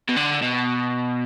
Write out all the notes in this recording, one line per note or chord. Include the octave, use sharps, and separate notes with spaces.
B2
D3
B2